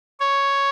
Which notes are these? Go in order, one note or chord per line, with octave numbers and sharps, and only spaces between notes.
C#5